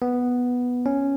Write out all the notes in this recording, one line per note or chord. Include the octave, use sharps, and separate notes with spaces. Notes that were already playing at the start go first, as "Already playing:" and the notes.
B3
C#4